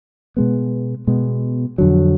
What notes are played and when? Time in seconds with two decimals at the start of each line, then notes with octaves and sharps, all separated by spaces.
0.37 B2 G#3 B3
1.07 B2 G#3 B3
1.78 F2 D3 F#3